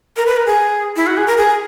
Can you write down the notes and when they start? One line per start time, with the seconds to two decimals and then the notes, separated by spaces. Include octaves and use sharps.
0.17 A#4
0.26 B4
0.37 A#4
0.46 G#4
0.96 E4
1.07 F#4
1.17 G#4
1.27 A#4
1.37 G#4